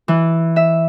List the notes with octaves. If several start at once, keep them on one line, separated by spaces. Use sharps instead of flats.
E3
E5